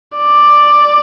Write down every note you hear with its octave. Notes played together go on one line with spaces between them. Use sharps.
D5